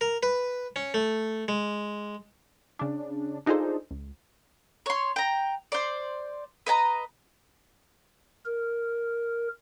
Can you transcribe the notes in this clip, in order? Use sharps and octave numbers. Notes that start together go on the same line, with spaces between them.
A#4
B4
C#4
A3
G#3
C#3 D4
D4 D#4 F4 G#4 A4 C5
C#2
C#5 C6
G5 A#5
C5 D5
B4 D#5 A5 A#5
A#4